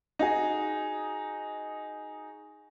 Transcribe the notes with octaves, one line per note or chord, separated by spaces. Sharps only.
D#4 F#4 G#4